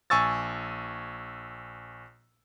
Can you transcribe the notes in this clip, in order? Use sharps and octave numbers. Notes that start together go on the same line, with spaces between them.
A#1 G#5 C#6 E6 A6